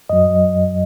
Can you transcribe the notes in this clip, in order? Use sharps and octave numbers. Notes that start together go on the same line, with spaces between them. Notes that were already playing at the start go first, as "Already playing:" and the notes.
F#2 F#3 D#5